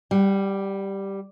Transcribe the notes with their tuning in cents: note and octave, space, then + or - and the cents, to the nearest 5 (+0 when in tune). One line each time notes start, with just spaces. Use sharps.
G3 +0 F#5 +45